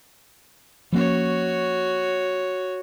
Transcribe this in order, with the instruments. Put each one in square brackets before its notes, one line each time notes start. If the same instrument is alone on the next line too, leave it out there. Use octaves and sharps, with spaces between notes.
[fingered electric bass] F3 A#3 C#4 [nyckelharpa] F#4 C#5